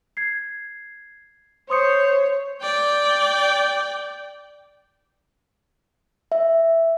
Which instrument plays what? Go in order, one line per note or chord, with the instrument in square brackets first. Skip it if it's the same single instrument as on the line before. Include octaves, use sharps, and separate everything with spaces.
[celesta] G#6 C7
[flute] C5 [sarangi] C#5 [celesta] C6 D#6 C#7
[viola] D5 G5
[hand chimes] E5